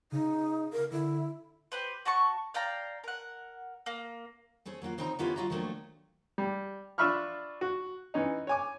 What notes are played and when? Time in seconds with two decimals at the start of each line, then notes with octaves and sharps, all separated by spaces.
0.12 C#3 D#4
0.73 A#4
0.92 D3 E4
1.72 G4 B4 C5
2.05 F#4 A5 C#6
2.54 D5 F5 G5 A#5
3.04 A#4 F#5
3.86 A#3
4.66 A3 C4 C#4 G#4
4.82 F#3 A#3 F4 F#4
4.98 C#3 C4 C#4 D#4 A5 A#5
5.19 D#3 B3 C#4 E4 F4 G4
5.36 F#3 C4 F4 F#4 D#5 A#5
5.50 D#3 F3 F#3 A3 A#3 D4
6.38 G3
6.98 D4 F4 E5 B5 C#6 F6
7.61 F#4
8.14 E3 C#4 D#4
8.47 C#5 G#5 D6